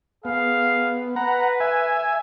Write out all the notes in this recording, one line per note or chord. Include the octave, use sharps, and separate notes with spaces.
B3 G#4 F5
B4 F#5 A#5
E5 G#5